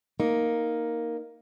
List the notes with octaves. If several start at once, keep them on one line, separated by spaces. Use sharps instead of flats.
A#3 D#4